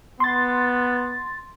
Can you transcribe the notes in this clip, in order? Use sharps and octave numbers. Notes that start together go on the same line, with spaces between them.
B3 C6 A6